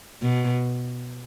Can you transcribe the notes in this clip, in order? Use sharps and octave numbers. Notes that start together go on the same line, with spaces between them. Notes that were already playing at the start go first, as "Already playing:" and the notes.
B2